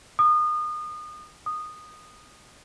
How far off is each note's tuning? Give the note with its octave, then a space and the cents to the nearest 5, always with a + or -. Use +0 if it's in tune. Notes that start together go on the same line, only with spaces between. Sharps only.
D#6 -30
D#6 -15